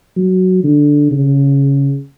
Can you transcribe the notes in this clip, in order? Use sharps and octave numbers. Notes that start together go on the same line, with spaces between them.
F#3
D3
C#3